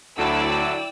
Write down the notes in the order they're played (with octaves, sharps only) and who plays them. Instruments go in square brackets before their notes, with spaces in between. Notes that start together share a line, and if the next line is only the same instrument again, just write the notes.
[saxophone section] D2 [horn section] D3 F#3 D4 [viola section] E4 [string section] D5 G5 E6